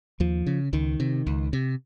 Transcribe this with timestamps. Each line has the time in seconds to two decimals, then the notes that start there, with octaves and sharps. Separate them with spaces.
0.20 D#2 F3
0.47 C#3
0.73 C#2 D#3
1.00 C3
1.27 C#2
1.53 C3